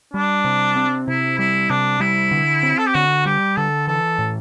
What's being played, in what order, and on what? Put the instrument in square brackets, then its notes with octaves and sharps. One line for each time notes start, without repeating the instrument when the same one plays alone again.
[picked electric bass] G3 [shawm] D4
[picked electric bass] C3
C4
[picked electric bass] C3 [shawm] E4
[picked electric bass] G3 [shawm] E4
[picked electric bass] C3 [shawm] D4
[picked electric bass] G3 [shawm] E4
[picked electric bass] D3
C4
[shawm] A4
G4
[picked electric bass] D3 [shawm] F#4
[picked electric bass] G3 [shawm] G4
[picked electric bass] D3 [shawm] A4
[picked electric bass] E3 [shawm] A4
[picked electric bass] A2